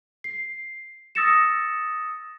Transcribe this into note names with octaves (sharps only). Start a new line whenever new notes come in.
C7
D#6 E6 A6 A#6 C#7 E7